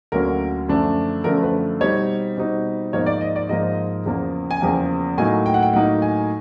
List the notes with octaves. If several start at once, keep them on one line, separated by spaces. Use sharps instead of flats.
D2 D3 F#3 A#3 C#4 A#4
F#2 D3 F3 A3 D4
F#2 D3 F3 A3 D4 A#4
B4
B2 G3 C4 D#4 C#5
B2 G3 C4 D#4
G#2 F3 A#3 D#4 C#5
D5
D#5
D5
G#2 F3 A#3 D#4 D#5
E2 C#3 F3 A#3
G#5
E2 C#3 F3 A#3 G5
A2 F#3 A#3 D#4 G#5
G5
F#5
G5
A2 F#3 A#3 D#4 F#5
G#5